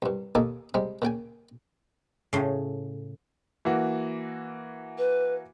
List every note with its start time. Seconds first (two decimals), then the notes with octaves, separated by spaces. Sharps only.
0.02 C2 G2
0.35 D#2 A#3 D#4 A4 G#5 D#6
0.74 C3 G3 G#3
1.02 A#2 C#3 G5 G#5
2.33 A2 C#3
3.65 E3 A#3 F#4
4.98 B4